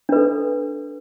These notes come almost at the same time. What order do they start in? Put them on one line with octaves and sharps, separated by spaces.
D4 B4 A4